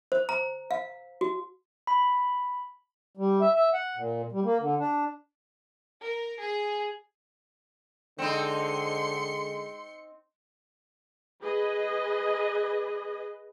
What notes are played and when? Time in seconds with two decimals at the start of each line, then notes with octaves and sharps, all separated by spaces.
0.12 C5
0.29 A#5
0.71 F5
1.21 F#4
1.87 B5
3.17 G3
3.41 E5
3.55 E5
3.74 F#5
3.97 A#2
4.32 G3
4.44 A#3
4.60 D3
4.79 D4
6.03 A#4
6.41 G#4
8.19 D3 G#3 C4 D#4 C6 C#7
11.43 G#4 B4 D#5